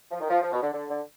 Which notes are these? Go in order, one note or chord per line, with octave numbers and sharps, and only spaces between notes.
F3
D#3
F3
F3
B2
D3
D3
D3